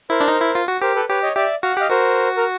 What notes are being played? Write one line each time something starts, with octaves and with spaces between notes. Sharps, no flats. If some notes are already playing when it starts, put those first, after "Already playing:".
E4 A#4 C5
D4
D#4
E4
F4
F#4
G4 A#4 C5
A4 B4
G4 B4 C#5
C#5 D#5
G4 D5 E5
F#4 F5
F#5
G4 D#5 F5
F#4 A#4 C5
A#4